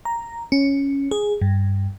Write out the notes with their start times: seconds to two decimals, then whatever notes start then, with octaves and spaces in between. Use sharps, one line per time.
0.05 A#5
0.52 C#4
1.11 G#4
1.42 G2